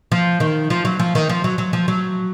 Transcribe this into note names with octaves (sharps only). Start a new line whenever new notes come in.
F3
D#3
F3
F#3
F3
D#3
F3
F#3
F#3
F3
F#3